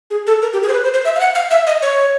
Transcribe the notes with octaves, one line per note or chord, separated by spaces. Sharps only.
G#4
A4
A#4
G4
G#4
C5
B4
C5
C5
E5
F5
F#5
F5
E5
D#5
C#5